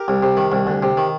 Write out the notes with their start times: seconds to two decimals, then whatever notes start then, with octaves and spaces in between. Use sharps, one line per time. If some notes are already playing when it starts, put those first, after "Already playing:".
Already playing: G4 A#4
0.08 C2
0.23 C3
0.37 D#3
0.52 C2
0.67 D2
0.83 C3
0.97 D#3